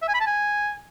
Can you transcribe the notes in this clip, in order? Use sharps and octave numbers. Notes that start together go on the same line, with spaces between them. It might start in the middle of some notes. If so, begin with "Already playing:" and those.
E5
G#5
B5
A5
G#5